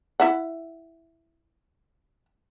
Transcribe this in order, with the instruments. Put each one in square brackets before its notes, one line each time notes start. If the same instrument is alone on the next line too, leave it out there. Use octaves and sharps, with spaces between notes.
[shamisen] E4 E5 F#5